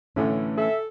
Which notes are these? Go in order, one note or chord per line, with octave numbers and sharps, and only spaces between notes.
A1 A2 D3 E3 A3 C#4
A4 E5